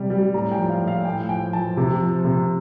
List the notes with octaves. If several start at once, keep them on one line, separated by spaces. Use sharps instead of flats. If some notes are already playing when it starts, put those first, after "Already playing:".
Already playing: C3 G3
G3
A2 A#5
G5
F3
F5
A2
F5
A2 G5
F3 G5
F3 A5
C3
F3
C3